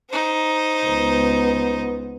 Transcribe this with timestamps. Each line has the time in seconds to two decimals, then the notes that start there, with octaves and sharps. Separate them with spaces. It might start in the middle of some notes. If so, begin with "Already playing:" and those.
0.10 D#4 C5
0.86 C#2 B3